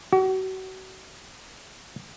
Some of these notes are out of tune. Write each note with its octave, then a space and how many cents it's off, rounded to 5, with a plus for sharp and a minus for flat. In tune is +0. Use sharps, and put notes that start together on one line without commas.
F#4 +35